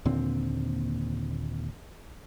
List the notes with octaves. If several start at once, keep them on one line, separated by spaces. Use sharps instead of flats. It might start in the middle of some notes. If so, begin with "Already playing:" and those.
D#2 A#2 D3 C4